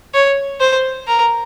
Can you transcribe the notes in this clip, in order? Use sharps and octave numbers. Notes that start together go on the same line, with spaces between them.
C#5
C5
A#4